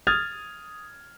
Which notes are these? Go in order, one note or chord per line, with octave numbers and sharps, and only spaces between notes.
D#6 F6 G#6 A6 F7